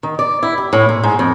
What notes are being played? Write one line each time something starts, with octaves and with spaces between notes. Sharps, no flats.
D#3
D5
E4
G4
A2
A#2
G#2
F2